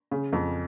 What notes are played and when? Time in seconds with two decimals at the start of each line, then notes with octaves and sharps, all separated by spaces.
0.11 C#3
0.33 F2